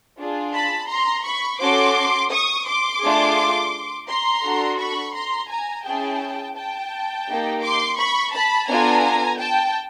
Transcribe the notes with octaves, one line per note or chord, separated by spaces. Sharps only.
D4 F4 G#4
A5 B5
A#5 C6
B5 C#6
C#4 F#4 A4 C6 D6
C#6 D#6
C6 D6
A3 D4 F4 G#4
A#5 C6
D4 F#4 A4
B5 C#6
A#5 C6
G#5 A#5
C#4 E4 G#4 G5 A5
G5 A5
A#3 D#4 G4
C6 D6
B5 C#6
A5 B5
B3 D4 F4 A4 G#5 A#5
G5 A5